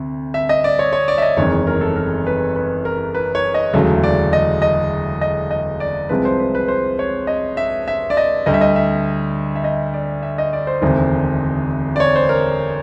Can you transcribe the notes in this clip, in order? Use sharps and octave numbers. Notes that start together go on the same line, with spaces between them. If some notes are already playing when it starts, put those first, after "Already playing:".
Already playing: D2 C3
E5
D#5
D5
C#5
C#5
D5
E5
D#5
F#1 E2 C3 D#3 G#3 C#5
A#4
A4
A#4
B4
B4
A#4
B4
C#5
D#5
E1 D2 C#3 F#3 A3
D5
D#5
D#5
D#5
D#5
D5
C2 C3 F3 G#3 B4
C5
B4
B4
C5
C#5
D#5
E5
E5
D5
D#5
D2 D3 G3 D#5
E5
D#5
E5
E5
D#5
D5
E5
D#5
D5
C5
E1 D2 C3 D#3
D5
C#5
C5
A#4